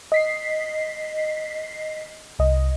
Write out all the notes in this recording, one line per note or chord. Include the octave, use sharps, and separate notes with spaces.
D#5 B6 C7
C2 D#5